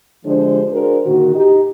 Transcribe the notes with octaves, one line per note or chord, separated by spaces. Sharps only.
D3 F3 G#3 D4 G4 C5
D4 F#4 G#4 A#4 C5
A#2 D3 D#3 F#4
D#4 G4